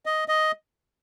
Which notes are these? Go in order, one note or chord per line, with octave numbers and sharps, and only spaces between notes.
D#5
D#5